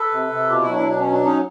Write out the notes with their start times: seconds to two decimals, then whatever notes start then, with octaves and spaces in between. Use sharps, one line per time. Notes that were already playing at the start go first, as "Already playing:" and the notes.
Already playing: A4 B4
0.11 C3
0.31 C3
0.49 B2 F4 G4
0.61 E4 F#4
0.68 F#3
0.74 D4 E4
0.86 B2 D4
0.99 C#4
1.05 F#3
1.12 D4
1.24 C#4 D#4